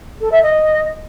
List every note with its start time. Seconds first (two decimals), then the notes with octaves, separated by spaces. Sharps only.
0.20 A4
0.31 E5
0.42 D#5